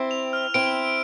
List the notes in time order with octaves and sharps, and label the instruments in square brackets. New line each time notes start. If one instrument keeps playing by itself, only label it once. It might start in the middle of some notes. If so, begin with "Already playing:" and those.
Already playing: [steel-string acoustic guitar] C4 E4
[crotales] F7
F6
[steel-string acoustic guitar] C4 E4 [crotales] D7
[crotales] F7